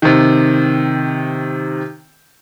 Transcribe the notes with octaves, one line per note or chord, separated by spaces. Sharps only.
C3 D#3